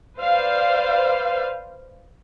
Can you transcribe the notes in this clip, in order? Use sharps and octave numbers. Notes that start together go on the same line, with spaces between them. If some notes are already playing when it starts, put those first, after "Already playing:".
B4 C5 D5 F5